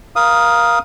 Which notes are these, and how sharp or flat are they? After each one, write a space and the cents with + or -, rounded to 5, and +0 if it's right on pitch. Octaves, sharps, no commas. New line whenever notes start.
A#4 +25 F5 +0 D#6 +0